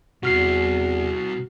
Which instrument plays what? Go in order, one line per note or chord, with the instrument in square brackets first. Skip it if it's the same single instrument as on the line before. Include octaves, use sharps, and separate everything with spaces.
[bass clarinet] E2 [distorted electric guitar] C3 G3 [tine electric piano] F#4 F6 C7